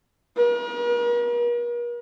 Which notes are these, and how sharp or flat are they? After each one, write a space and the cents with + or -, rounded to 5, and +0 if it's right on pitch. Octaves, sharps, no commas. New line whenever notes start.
A#4 +45